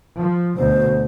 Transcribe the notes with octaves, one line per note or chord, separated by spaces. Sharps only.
F3
D2 B2 C5